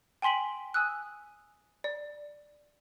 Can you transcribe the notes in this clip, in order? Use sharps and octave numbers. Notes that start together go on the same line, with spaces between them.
G5 G#5 C6 B6 F#7
G#5 D#6 E6 F#6
D5